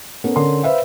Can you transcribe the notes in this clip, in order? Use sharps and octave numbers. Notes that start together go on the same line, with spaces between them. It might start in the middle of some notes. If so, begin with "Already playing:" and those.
B3 C#4 A4 A#4
D3 C#4 A#4 C6
B4 C5 E5 F5